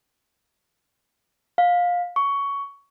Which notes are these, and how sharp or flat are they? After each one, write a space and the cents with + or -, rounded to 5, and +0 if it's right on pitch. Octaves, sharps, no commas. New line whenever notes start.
F5 +20
C#6 +15